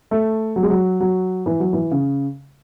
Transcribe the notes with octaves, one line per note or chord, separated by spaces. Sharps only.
A3
F#3
G#3
F#3
F#3
E3
F#3
E3
C#3